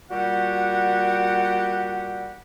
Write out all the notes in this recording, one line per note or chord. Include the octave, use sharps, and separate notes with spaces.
A#2 G3 F#4 G4 F#5